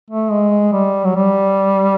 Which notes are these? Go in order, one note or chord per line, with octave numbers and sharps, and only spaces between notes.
A3
G#3
G3
F#3
G3